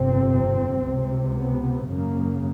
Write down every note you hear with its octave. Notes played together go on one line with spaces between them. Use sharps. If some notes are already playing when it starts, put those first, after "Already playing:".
Already playing: G1 F2 C3 C4
C#2 C3
B3
G#1 F#2 C#3 A#3